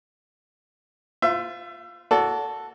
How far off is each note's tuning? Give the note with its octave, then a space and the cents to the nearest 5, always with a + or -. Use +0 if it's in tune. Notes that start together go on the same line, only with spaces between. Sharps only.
F4 +5 C5 -35 E5 +25
F#4 -15 A4 +0 D5 -35